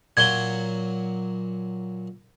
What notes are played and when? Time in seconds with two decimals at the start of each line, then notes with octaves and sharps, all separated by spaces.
0.17 A#2 F#3 G#6 G7